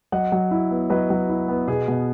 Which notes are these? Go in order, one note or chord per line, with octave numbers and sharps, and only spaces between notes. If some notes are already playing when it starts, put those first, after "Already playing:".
F#3 D#5 F#5
F#3
E4
B3
F#3 B4 D#5
F#3
E4
B3
B2 G#4
B2